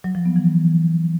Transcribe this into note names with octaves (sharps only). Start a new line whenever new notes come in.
F#3
F3
B3
E3